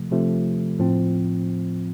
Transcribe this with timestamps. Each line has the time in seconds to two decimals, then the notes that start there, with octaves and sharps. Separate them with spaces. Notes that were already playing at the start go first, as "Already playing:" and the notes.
Already playing: C3 F3 A3
0.11 C3 F3 A3
0.79 A2 F3 C4